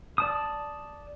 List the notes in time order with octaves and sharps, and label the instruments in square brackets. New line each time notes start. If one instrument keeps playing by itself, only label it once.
[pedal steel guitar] D5 A5 D#6